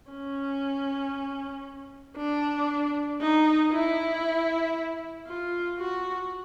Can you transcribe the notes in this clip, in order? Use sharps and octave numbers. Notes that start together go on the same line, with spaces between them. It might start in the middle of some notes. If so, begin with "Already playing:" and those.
C#4
D4
D#4
E4
F4
F#4